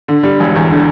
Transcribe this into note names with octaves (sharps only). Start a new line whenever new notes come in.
D3
G3
E1
E2
D3